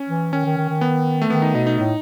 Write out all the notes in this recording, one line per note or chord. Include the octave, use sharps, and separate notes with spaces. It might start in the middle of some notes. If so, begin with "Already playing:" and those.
Already playing: C#4
E3
D#3 C#4
D#3
D#3
D#3
B3
A3
D#3 B3
D#4
B2 D#4
D#4
A2